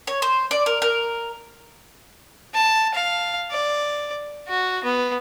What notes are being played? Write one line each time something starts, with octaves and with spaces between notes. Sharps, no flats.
C#5
C5
D5
A#4
A#4
A5
F5
D5
F#4
B3